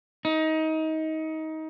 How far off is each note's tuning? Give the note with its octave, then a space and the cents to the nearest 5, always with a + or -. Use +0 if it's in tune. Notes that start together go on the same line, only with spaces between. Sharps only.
D#4 +25